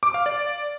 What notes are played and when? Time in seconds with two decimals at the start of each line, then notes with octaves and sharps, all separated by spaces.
0.03 D6
0.14 F5
0.26 D5